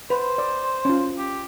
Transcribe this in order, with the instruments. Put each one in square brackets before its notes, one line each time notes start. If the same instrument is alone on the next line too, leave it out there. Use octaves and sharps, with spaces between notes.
[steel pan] B4 [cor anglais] C5
[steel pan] D5
C#4 F4
[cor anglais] G4